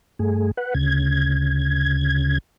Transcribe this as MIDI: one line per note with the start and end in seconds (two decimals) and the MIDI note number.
0.19 0.51 43
0.19 0.51 57
0.19 0.51 68
0.57 0.74 71
0.57 0.74 78
0.75 2.38 38
0.75 2.38 49
0.75 2.38 92